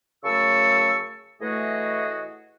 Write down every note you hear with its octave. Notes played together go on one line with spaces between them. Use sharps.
F#2 C#3 A3 A5 C#6 E6
A2 E3 A3 F#4 G#4 D#5